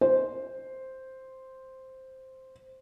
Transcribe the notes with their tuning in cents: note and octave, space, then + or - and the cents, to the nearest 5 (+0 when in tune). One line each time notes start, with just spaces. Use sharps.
C5 +0